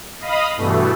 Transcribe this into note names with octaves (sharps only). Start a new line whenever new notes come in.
D#5 F5 B5 D#6
G2 B2 E3 A3